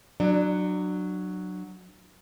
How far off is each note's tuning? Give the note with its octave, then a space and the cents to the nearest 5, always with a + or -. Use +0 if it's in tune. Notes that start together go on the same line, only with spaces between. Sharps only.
F#3 +0 D4 +25